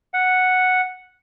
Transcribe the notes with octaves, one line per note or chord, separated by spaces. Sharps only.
F#5